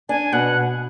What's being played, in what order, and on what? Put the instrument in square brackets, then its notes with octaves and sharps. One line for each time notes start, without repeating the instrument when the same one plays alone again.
[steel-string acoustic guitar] D4 [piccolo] G#5
[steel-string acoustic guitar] B2 [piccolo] F#5